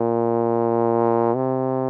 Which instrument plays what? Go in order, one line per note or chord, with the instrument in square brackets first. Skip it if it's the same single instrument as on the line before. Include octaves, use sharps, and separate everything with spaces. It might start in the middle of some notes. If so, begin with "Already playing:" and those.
Already playing: [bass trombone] A#2
C3